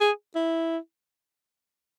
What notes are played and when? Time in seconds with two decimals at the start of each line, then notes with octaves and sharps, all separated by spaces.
0.01 G#4
0.35 E4